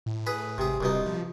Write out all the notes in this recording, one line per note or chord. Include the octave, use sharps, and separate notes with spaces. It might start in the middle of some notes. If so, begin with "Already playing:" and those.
A2
G#4 B4 B5
G#1 C3 G#4
D1 C2 B2 D#4
F3